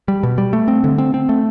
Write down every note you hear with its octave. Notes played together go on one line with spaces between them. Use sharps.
G3
B2
G3
A3
C4
D3
C4
C4
A3